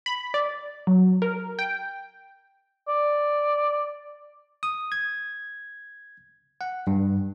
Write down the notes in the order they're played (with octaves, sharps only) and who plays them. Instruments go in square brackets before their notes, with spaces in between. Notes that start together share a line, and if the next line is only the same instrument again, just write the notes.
[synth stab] B5
D5
F#3
A#4
G5
[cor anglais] D5
[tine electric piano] D#6
G#6
F#5
G2